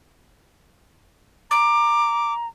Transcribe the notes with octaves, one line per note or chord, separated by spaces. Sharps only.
A#5 D6